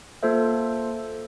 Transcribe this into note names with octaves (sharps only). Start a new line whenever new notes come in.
A#3 F4 A4 C5 E5